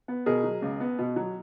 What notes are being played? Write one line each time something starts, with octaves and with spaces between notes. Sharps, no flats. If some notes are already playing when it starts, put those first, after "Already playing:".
B3
B2 G#4 A#4
F#3
C#2
B3
B2
F#3